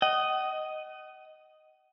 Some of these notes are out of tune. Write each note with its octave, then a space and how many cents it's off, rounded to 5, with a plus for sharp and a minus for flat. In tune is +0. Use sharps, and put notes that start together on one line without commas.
D#5 +0 F#5 +40